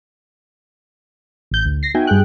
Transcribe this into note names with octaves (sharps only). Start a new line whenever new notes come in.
A1 G6
D2
A#6 C7
B3 D#4 F#4 E5 G5 G#5
G2 G#4 G5 F#6